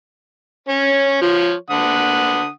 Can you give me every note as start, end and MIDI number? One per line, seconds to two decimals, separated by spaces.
0.69 1.18 61
0.69 1.18 73
1.22 1.53 53
1.22 1.53 73
1.70 2.49 50
1.70 2.49 78
1.70 2.49 87